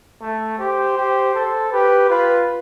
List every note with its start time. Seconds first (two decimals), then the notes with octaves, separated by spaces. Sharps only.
0.21 A3
0.59 G4 C5
0.97 G4
1.34 A4
1.72 G4 B4
2.09 F4 B4